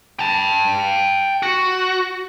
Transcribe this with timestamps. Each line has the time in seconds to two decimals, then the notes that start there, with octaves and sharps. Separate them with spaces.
0.19 G5 A5
1.43 F#4